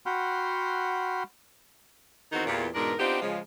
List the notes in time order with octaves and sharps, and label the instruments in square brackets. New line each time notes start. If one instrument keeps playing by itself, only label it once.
[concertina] F#4 F#5 G5 B5 C6 F6
[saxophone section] E2 D#3 C4 D#4 F#4
E2 A#2 G4
E2 G#2 B2 D4 A#4
B3 C4 D4 D#4 F4 G4
C#3 F3 G#3